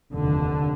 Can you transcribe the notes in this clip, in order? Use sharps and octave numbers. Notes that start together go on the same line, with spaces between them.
F1 D#2 D3